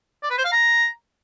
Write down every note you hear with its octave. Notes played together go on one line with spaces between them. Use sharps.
D5
B4
C5
F5
A#5